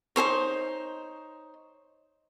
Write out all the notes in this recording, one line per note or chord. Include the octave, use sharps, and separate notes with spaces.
D#4 G#4 C5 C#5